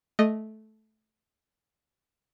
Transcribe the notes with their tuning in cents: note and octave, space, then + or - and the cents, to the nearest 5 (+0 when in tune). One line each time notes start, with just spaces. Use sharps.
A3 -15 D#5 -5